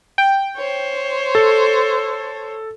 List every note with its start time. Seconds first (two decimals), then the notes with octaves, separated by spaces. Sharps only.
0.18 G5
0.56 C5 C#5
1.35 A4